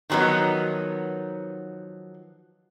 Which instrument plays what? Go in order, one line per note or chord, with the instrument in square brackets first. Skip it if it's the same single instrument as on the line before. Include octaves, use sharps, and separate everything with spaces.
[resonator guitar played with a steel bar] D#3 F3 F#3 B3 D#4